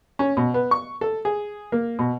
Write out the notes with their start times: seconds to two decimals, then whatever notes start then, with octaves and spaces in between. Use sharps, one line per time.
0.19 C#4
0.37 B2
0.54 B3
0.71 C#6
1.01 A4
1.25 G#4
1.72 A#3
1.99 B2